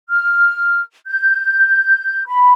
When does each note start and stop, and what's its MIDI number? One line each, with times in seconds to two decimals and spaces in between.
0.10 0.82 89
1.06 2.23 91
2.26 2.53 83